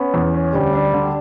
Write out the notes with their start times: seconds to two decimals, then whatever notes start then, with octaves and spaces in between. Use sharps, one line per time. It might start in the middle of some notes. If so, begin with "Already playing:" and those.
Already playing: B3 C#4
0.14 E2
0.34 C#4
0.53 D2 G3
0.74 D4
0.94 D3